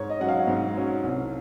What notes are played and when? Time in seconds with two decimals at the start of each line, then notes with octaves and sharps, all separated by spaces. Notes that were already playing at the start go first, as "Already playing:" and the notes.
Already playing: G#2 C#5
0.10 D#5
0.20 F#3 C#4 F#5
0.28 F5
0.47 G#2
0.76 F#3 C#4
1.04 C2